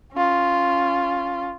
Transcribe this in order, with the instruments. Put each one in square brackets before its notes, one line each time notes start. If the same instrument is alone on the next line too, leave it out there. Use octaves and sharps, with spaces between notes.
[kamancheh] C#4 F4